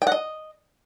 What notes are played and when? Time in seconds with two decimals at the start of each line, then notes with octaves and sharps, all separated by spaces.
0.02 G5
0.07 F#5
0.12 D#5